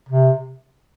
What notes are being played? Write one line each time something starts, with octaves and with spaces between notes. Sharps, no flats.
C3